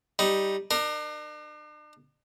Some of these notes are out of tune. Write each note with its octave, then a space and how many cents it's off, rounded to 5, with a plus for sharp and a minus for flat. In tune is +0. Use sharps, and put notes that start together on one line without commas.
G3 +0 D#4 +0
D4 +40 A#4 +0